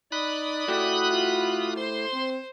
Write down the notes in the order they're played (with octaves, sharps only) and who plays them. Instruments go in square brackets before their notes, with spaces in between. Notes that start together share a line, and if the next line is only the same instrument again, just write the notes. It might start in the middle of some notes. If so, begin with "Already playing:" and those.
[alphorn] D#4 [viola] D5 [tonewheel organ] B5 D#6 F#6
[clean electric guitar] A3 E4 G4 [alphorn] F#4
[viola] F4
[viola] C5 [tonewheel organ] C6
[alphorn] C4